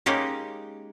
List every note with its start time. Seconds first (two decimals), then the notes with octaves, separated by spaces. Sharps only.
0.06 G#3 A#3 C#4 D#4 G4